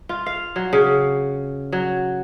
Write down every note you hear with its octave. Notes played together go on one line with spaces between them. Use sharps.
F4
F5
F#3
C#3
F#3